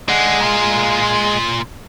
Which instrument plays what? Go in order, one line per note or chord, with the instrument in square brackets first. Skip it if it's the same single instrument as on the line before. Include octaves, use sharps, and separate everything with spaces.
[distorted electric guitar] G#3 [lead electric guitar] D5 F#5
[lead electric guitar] A#2 F4